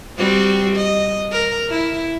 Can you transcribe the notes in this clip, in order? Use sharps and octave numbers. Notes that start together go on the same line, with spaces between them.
G3 C4 F#4
D#5
A#4
E4